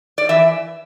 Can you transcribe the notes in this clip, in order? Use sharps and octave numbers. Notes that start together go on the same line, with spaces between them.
D5
E3 E5